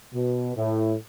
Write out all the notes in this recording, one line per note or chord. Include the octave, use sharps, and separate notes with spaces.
B2
A2